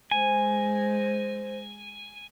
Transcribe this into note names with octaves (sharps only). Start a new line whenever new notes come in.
G#3 C5 G#5